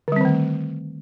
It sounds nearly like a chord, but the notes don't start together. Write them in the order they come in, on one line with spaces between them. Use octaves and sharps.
D3 G3 C4 D#3 A3